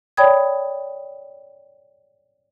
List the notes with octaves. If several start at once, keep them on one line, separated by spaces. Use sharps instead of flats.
C#5 D5 G5 B5 D#6 G#6